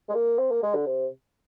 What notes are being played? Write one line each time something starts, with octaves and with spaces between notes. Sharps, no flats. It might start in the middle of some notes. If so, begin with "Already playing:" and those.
G#3
A#3
C4
A#3
G#3
D3
C3